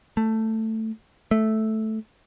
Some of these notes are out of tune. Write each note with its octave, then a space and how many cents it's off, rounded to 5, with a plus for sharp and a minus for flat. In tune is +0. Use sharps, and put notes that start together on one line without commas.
A3 +10
A3 -5